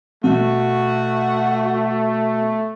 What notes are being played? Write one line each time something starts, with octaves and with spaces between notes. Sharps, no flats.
B2 A3 F#4